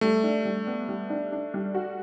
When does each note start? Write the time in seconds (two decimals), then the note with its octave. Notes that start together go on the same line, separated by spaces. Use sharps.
0.01 G3 A3
0.23 D4
0.45 G3
0.67 B3
0.89 G3
1.10 D4
1.32 D4
1.54 G3
1.74 F#4